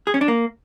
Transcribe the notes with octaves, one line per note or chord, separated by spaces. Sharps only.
G#4
C#4
D4
A#3